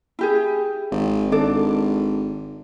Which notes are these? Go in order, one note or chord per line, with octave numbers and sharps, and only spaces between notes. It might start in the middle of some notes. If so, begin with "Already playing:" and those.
E4 G4 G#4
G#1
G#1 D4 A4 D5